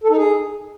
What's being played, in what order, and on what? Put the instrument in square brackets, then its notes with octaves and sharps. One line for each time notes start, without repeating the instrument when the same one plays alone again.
[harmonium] A4
D#4
G#4